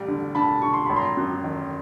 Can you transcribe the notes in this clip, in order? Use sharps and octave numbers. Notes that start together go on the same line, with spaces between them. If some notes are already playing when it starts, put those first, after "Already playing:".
Already playing: A1 G3
D3
D3 A5 B5
D3 C#6
C6
G#1 B5
A#5 C6
F#2
D#3